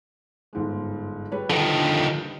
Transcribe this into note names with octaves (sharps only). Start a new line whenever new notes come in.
G1 G#2 G#3
G3 B4 C#5
D3 D#3 F3